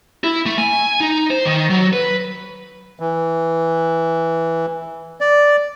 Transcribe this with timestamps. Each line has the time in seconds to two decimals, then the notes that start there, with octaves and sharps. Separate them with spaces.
0.24 E4
0.46 A3
0.58 G#5
1.00 D#4
1.30 C5
1.45 D#3
1.70 F#3
1.93 B4
3.00 E3
5.21 D5